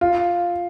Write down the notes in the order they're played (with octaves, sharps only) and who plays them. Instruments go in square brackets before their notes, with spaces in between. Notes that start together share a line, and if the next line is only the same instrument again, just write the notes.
[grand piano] F4